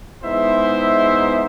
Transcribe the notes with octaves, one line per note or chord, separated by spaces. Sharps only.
G#3 B3 D#4 E4 C5 E5